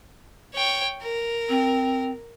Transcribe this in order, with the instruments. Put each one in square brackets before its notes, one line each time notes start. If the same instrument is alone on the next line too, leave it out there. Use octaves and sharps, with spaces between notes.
[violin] C#5 G5
A#4
[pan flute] C4